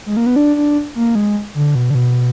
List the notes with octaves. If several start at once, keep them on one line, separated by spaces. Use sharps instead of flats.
G#3
A#3
B3
D4
D4
A#3
G#3
D3
B2
D3
B2